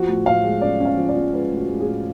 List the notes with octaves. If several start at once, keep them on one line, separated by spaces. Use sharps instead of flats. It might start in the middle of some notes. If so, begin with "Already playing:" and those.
Already playing: F3 F#4
A2
A2 F5
G#3
C#4 D5
C#4
F5
F3
D5
F3
G#3 B4
A2
F#4
G#3
G#4
A2